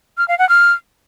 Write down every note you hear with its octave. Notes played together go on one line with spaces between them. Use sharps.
F6
F5
F#5
F6